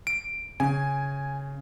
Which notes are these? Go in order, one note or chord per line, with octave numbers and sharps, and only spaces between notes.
D7
C#3 G#5